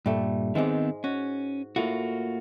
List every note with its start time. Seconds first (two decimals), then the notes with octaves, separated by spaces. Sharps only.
0.06 G2 A#2 G3 A3
0.55 G#2 D#3 G#3 B3 C4
1.04 C#4 F#4
1.76 A2 A#3 F4 F#4